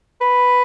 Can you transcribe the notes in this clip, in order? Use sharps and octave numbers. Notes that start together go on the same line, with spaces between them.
B4